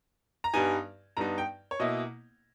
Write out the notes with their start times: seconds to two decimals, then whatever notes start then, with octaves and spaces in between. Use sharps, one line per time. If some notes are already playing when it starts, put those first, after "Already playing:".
0.44 A#5
0.54 G2 G3 B3 D#4 G#5
1.17 G2 G3 B3 D#4 A#5
1.38 G5
1.71 C#5
1.80 B2 A#3 E4 D#5